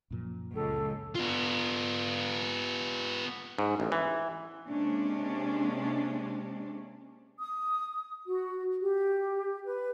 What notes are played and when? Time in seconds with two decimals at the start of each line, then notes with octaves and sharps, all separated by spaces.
0.10 F#2 A#2 F3
0.55 C#2 A4
1.15 B3 F4
3.58 G#2
3.80 A1
3.92 E3
4.68 C3 G#3 A#3 C#4 D4
7.39 D#6
8.27 F#4
8.82 G4
9.64 B4